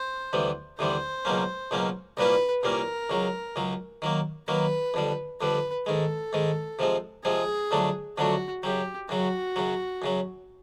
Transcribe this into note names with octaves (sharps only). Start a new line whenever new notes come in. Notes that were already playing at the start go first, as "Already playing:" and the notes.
Already playing: C5
D2 C3 E3 G3 B3
D2 C3 E3 G3 B3 C5
C#2 B2 F#3 A#3 C#4
C#2 B2 F#3 A#3 C#4
C2 A#2 G3 A#3 C#4 B4
C2 A#2 G3 A#3 C#4 A#4
C#2 C#3 F#3
C#2 C#3 F#3
D#3 F#3 A#3
D#3 F#3 A#3 B4
F2 D3 G3
F2 D3 G3 B4
G#2 D#3 G#3 A4
G#2 D#3 G#3
C3 F3 G#3 C4
C3 F3 G#3 C4 G#4
F2 D3 F#3 A3 D4
F2 D3 F#3 A3 D4 F#4
F#2 C#3 F#3 G4
F#2 C#3 F#3 F#4
F#2 C#3 F#3
F#2 C#3 F#3